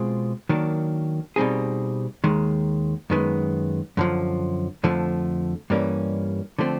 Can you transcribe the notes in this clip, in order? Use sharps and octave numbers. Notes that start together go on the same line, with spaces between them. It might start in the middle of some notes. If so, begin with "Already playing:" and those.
Already playing: B2 G#3 C4 F4 G#4
D#3 F#3 A#3 D4
B2 G3 C4 D#4 G#4
D#2 D#3 G#3
F#2 D#3 G#3 B3
F#2 D3 F3
F2 D3 F3 A3
G2 E3 G3 A#3 C#4
D3 F3 A3 C4